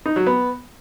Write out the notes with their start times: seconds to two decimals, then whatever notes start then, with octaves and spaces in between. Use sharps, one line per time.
0.06 D#4
0.16 F#3
0.27 B3